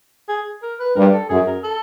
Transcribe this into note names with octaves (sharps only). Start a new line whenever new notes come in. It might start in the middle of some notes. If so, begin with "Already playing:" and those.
G#4
A#4
B4
G2 A#4
A4
F#2 G#4
A#4
A4